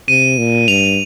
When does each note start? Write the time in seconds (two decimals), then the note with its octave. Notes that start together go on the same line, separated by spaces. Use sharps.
0.08 C3 D#7
0.38 A#2
0.68 G2 F7